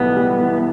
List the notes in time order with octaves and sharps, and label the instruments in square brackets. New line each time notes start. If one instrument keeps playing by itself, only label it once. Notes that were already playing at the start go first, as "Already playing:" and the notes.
Already playing: [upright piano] B1 A2 E3 G3 [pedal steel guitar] B3
[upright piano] G3
E3